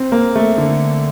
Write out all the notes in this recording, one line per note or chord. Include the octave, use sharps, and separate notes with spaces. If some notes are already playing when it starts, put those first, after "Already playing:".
Already playing: C4
A#3
A3
D3